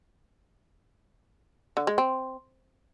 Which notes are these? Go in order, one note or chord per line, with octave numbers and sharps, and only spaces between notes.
D3
G#3
C4